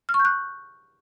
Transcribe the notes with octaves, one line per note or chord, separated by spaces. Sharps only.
F6
C#6
G6
F#6